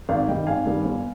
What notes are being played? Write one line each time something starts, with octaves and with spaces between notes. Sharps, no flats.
G#1 D5 F5
G2 D#3 G3 D#5 G5
G#1 F5 G#5
G2 D#3 G3
G1